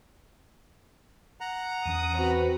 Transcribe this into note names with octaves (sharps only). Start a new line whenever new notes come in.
F#5 A#5
E2 E3 C#4 D#6
C4 F#4 B4